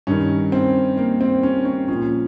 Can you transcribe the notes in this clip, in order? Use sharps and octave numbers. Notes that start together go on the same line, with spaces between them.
G2 D#3 C#4
C4
A#3
C4
C#4
C#4
A#2 F3 C#4